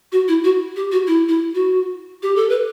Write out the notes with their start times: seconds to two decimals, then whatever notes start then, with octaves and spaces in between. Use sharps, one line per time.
0.12 F#4
0.28 E4
0.44 F#4
0.76 G4
0.92 F#4
1.07 E4
1.28 E4
1.55 F#4
2.23 G4
2.36 A4
2.49 B4